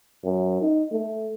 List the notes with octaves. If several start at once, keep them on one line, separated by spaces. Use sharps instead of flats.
F#2
D#4
A3